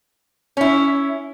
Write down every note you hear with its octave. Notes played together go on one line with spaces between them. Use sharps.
C#4 E4